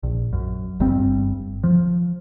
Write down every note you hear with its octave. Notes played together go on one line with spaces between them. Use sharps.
A#1
F#2
G1 G2 G3 C4
F3